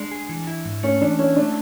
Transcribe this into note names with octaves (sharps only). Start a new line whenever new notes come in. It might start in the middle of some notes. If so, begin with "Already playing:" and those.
Already playing: G#3 D4
G#4
E3
E4
G#2
A3 C#4
E3 D4
C#4 E4
A3 D4